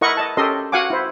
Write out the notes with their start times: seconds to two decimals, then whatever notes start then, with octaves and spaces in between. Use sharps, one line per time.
0.01 E4 A#4 D#5 F#5 C#6
0.17 D#5 A5
0.37 C#4 G4 A4 A#4 D#5 C6
0.72 F#4 F5 F#5 G#5 D6
0.90 E4 C5